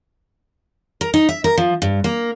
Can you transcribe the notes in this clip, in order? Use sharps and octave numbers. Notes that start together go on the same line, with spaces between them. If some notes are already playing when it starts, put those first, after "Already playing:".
A#4
D#4
E5
A#4
F3
G2
A#3